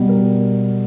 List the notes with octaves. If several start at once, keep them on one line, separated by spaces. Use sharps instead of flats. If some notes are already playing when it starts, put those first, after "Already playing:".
Already playing: B2 G3
A#4